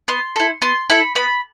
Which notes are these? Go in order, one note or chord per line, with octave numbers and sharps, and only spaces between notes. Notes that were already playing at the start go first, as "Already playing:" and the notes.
B3 C6
E4 A4
B3 C6
E4 A4 B5
B3 B5